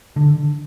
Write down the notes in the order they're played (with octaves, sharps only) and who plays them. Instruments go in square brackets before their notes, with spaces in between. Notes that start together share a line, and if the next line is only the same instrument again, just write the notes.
[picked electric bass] D3